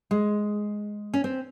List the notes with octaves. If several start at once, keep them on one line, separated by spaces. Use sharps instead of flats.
G#3
C#4
C4